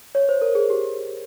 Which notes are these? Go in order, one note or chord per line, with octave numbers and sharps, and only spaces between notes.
C#5
C5
A#4
G#4
G4